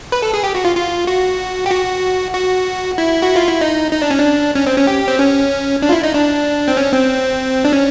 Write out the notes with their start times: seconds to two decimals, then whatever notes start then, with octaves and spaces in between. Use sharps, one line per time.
0.12 B4
0.22 A4
0.34 G#4
0.44 G4
0.55 F#4
0.65 F4
0.76 F4
1.07 F#4
1.66 G4
1.71 F#4
2.34 F#4
2.98 E4
3.22 F#4
3.36 F4
3.48 E4
3.61 D#4
3.92 D#4
4.02 D4
4.10 C#4
4.18 D4
4.55 C#4
4.67 C4
4.77 C#4
4.87 G4
5.08 C4
5.19 C#4
5.82 D4
5.89 F4
5.92 E4
6.03 D#4
6.14 D4
6.68 C4
6.77 C#4
6.93 C4
7.65 D4
7.73 C#4